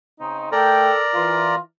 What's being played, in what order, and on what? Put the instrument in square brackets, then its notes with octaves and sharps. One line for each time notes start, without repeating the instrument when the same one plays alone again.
[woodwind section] C#3 C4 D#4
[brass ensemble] A3 G5 [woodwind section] A4 [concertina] A#4 D5 A#5
[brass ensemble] E3 [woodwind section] F4